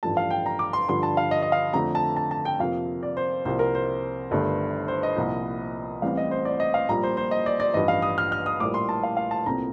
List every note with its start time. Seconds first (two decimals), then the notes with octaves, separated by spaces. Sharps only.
0.03 A1 G2 F3 A3 A5
0.17 F5
0.31 G5
0.46 A#5
0.59 D6
0.73 C6
0.88 G2 D3 F3 C6
1.03 A5
1.17 F5
1.31 D#5
1.42 D#5
1.52 F5
1.73 F2 D3 A3 A#5
1.95 A5
2.16 A5
2.31 A5
2.45 G5
2.59 F2 C3 F3 A#3 F5
3.03 D5
3.17 C5
3.45 C2 C3 F3 A#3 C5
3.59 A#4
3.75 C5
4.31 G1 G2 D#3 A3
4.88 C5
5.03 D#5
5.16 C2 A#2 F3 C4
6.02 A1 A2 G3 C4 F5
6.17 D#5
6.31 C5
6.45 D5
6.60 D#5
6.74 F5
6.89 A#1 A#2 G3 A#5
7.03 C5
7.17 C5
7.31 D#5
7.46 D5
7.60 D5
7.74 A1 G2 F3 D#5
7.88 F5
8.02 D#6
8.18 F6
8.32 F6
8.46 D#6
8.60 A#1 A2 G3 A#3 D6
8.74 C6
8.89 A5
9.03 F5
9.17 F5
9.31 A5
9.46 C2 A#2 A3 C4 A#5